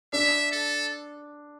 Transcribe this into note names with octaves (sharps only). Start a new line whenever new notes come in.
D4 E5
A4